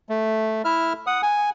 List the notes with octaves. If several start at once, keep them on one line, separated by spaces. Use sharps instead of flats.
A3
E4 E5 F6
F#5 D#6
G#5